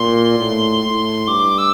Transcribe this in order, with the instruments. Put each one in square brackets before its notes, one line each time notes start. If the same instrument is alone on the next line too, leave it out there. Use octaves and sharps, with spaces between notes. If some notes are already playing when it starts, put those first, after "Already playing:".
Already playing: [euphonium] A#2 [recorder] C6
[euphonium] A2
A2
[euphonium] G2 [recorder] D6
[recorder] E6